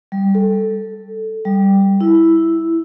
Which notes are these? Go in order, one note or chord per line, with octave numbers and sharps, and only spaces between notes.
G3
A4
G3
E4